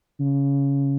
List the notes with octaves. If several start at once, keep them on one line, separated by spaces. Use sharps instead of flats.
C#3